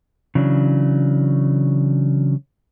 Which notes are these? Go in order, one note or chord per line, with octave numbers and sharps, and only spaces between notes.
C#3 E3 F#3 D4